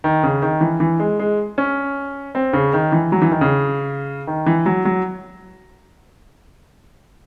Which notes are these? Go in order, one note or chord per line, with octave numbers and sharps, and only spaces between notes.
D#3
C#3
D#3
E3
E3
G#3
G#3
C#4
C4
C#3
D#3
E3
F#3
E3
D#3
C#3
D#3
E3
F#3
F#3